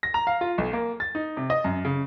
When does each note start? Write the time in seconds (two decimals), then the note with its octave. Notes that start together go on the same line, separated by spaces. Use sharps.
0.03 A#6
0.14 A#5
0.27 F5
0.41 F4
0.58 B1
0.73 A#3
1.00 A6
1.15 D#4
1.37 C3
1.50 D#5
1.64 F#2
1.85 C#3